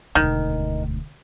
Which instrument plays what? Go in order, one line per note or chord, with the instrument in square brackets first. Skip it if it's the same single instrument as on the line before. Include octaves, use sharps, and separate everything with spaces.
[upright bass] E1 D2 [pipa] D#3